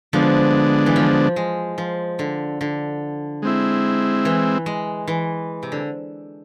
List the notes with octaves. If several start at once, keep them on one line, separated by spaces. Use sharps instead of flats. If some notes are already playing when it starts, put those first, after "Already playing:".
D3 F3 G#3 B3 D4
E3
F3
G#3
F3
D3
D3
G#3 C4 E4
E3
G#3
E3
C3
D3